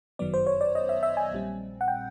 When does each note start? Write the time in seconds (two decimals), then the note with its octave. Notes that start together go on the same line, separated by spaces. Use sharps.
0.19 G1 F#2 D#3 F#3 B3 D5
0.34 C5
0.47 C#5
0.61 D5
0.75 D#5
0.89 E5
1.03 E5
1.17 G#5
1.31 A#1 A#2 G3 C4
1.81 F#5
1.88 G5